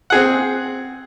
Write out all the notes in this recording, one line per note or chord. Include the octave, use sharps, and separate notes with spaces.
C4 G#4 F#5